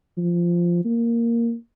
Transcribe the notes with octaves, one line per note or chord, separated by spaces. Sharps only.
F3
A#3